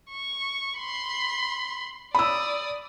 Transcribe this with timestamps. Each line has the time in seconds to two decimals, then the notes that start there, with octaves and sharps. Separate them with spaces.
0.10 C#6
0.79 B5 C6
2.15 D5 B5 D#6 E6